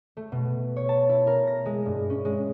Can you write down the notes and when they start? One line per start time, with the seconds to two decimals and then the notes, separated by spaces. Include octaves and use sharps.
0.17 A3
0.32 B2
0.76 C#5
0.89 A5
1.09 E4
1.27 A#4
1.47 A#6
1.66 G#3
1.86 G2
2.10 C#4
2.25 G#3